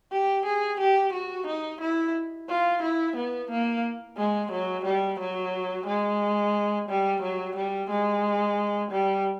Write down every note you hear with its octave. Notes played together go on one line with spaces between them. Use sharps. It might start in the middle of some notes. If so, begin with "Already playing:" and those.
G4
G#4
G4
F#4
D#4
E4
F4
E4
B3
A#3
G#3
F#3
G3
F#3
G#3
G3
F#3
G3
G#3
G3